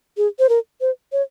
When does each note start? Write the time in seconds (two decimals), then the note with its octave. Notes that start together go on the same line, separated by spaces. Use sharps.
0.17 G#4
0.39 C5
0.49 A#4
0.81 C5
1.12 C#5